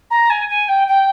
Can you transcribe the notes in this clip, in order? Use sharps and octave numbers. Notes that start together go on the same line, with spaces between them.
A#5
G#5
G#5
G5
G5